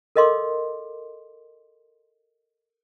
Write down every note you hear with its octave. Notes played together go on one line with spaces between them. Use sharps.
A4 A#4 D#5 F5 C6 D6